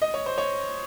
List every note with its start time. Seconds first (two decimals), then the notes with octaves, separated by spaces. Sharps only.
0.02 D#5
0.14 C#5
0.26 C5
0.38 C#5